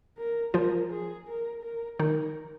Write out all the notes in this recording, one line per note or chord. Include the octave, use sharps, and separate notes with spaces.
A#4
F3 F4 A#4
G#4
A#4
A#4
D#3 D#4 A#4